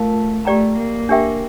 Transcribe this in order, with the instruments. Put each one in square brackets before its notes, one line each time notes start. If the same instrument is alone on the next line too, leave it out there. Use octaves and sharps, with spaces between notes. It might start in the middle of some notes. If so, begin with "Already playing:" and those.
Already playing: [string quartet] A3 [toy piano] F4 A#4 F5 A5
[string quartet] A3 [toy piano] G4 D5 G5 A#5
[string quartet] A#3
[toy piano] D4 G4 A#4 E5 G5